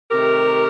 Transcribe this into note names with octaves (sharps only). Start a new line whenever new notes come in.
C3 D#3 A3 G4 A#4